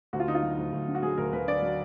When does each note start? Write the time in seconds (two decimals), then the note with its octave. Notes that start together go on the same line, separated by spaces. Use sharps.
0.13 D2 F#4
0.20 F4
0.28 D3 D#4
0.35 F4
0.43 F#3
0.58 D2
0.72 D2
0.88 D3
0.95 F#4
1.03 F#3 G#4
1.17 D2 A#4
1.33 D2 B4
1.48 D3 D5
1.63 F#3